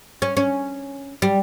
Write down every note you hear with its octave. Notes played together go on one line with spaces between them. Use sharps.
C#4
C#4
G3